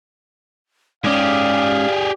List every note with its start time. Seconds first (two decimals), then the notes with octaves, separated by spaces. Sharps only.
1.04 G#2 C#4 G4 G#4 D5 F5